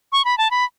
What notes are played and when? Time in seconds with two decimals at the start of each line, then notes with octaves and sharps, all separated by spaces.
0.12 C#6
0.25 B5
0.38 A5
0.51 B5